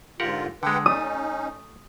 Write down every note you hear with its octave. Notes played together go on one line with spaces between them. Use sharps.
G#2 D3 F4 G4 A#4 F#5
D3 G#3 B4 F#5 G5
A3 C#4 D#4 D#6